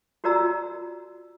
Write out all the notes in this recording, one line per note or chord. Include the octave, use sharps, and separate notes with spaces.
F4 F#4 A#4 D5 A#5 E6